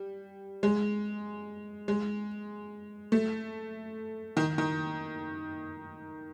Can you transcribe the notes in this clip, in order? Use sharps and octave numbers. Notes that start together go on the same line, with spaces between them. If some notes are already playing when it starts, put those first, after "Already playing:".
Already playing: G3
G#3
G#3
A3
D#3
D#3